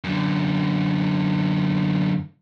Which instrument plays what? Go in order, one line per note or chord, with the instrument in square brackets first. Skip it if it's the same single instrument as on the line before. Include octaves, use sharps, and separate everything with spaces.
[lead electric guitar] F#2 D3